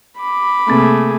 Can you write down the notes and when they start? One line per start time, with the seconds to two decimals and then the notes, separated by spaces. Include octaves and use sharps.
0.17 B5 D6
0.68 C3 A3 A#3 C4 G#4